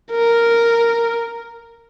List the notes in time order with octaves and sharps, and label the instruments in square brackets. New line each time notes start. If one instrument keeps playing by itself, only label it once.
[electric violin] A#4